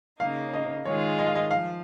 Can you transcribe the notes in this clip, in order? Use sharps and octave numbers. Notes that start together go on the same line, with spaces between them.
C#3 A#3 D#4 F5
D#5
D#3 G#3 F4 G#4 C#5
D#5
F5
D#5
F3 F5